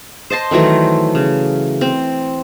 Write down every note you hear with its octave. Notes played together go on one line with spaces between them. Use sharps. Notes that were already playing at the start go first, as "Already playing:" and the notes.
C5 D#5 A5 C6
D#3 E3 F#3 A3
C#3
C4